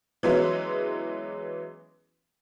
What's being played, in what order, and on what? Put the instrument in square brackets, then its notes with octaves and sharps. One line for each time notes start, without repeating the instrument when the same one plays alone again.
[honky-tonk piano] E3 F#3 G#3 B3 C#4 E4